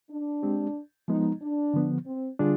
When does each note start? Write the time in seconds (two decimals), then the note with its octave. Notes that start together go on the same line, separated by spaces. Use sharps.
0.11 D4
0.43 G#3 C4 G4
1.08 F3 G#3 B3 D#4
1.41 D4
1.74 D3 F3 B3
2.06 C4
2.39 D3 G3 D4 F4 G#4